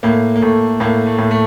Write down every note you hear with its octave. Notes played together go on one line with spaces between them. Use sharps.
A2 A#3
A#3
A2 A3
A2 A#3
A3
A2
A3